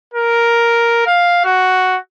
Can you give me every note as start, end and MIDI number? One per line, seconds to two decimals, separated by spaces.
0.14 1.06 70
1.07 1.44 77
1.45 1.97 66